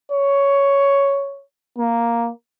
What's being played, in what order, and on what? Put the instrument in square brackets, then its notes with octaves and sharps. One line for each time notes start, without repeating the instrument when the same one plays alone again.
[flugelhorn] C#5
A#3